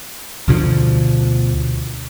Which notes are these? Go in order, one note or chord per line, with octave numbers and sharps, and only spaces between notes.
D2 B2 D3 F3